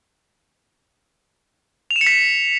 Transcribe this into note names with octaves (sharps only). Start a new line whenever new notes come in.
F7
E7
C#7
B6